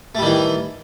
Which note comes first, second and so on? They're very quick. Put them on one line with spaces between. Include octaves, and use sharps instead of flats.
A3 G3 D#3 E3